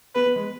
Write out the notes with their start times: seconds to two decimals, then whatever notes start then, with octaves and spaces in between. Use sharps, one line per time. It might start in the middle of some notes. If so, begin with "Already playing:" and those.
0.15 B3 B4
0.26 B3
0.36 G#3